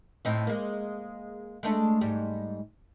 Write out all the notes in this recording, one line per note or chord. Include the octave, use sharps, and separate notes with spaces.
A2 C4 D#4
G#3 A#3
G#3 A3 D4
G#2 G3